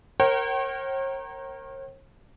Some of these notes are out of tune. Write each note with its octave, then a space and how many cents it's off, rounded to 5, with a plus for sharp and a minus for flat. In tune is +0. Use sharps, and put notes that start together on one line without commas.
A#4 +0 C#5 -45 G5 -45